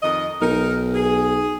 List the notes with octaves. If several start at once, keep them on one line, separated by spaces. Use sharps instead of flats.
F2 D#3 D#5
B1 D#4 A#4
G#4